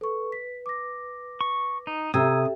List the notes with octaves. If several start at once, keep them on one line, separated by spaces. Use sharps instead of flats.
A4 B4 C#6
B6
D6 A#6
C#6
D#4
C3 G4 A4 E5 A#5 D#6 E6 G#6